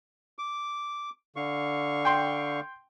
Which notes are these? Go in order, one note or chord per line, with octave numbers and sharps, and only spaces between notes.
D6
D3 F5 C#6
G5 C6